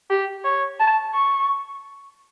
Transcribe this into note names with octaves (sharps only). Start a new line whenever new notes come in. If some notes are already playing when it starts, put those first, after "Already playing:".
G4
C#5
A5
C#6